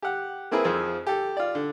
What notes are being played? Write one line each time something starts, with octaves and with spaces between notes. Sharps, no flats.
G4 F#5
A#3 C4 E4 G#4 A#4 B4
F2 F3 G#4 C5 E6
G4 A4
F4 D5
D3